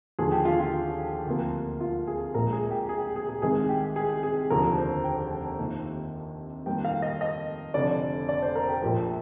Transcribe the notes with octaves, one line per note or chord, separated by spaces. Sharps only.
D#2 D3 F3 G#4
G4
F4
F4
D2 C3 F3 A#3
F4
G#4
A#1 A#2 G#3 A#4
G#4
G4
G#4
G#4
G#4
C2 C3 D#3 G#3 G#4
G4
G#4
G#4
F1 D#2 D3 F3 A#4
C5
G5
F2 C3 D#3 A#3
F2 D#3 G3 A#3 G5
F5
D#5
D#5
F1 F2 D3 D5
D5
C5
A#4
G4
A#1 A#2 F3 A#3 G4